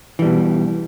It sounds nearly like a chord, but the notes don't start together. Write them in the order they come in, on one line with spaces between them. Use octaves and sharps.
E3 G3 B2